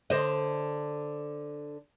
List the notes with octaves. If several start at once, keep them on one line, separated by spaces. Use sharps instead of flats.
D3 C5 D#5